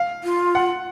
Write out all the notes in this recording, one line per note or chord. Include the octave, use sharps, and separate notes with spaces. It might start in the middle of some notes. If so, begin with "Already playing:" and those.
Already playing: F5
F4
F#5